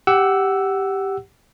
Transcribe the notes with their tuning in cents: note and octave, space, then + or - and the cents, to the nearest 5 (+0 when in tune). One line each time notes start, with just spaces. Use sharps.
G4 +0 F#5 +15 E6 +0